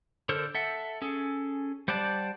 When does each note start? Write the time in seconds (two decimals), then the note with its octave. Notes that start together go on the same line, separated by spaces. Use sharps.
0.29 D3 A4 A#4 C5
0.55 A4 E5 F#5
1.02 C#4 G#4 A4
1.88 G3 C5 D5 F#5 A5